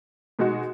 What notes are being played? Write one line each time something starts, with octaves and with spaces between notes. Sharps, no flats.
B2 G#3 D#4 F#4